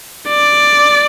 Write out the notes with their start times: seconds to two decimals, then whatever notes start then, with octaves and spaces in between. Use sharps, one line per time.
0.29 D5